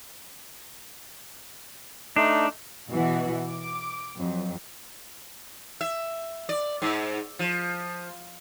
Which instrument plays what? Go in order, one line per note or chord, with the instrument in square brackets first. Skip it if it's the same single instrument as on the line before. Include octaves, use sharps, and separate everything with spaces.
[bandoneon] A3 D#4 [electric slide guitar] D4
[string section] B2 E3 F#4
D6
F2 F#3
[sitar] E5
D5
G#2
F3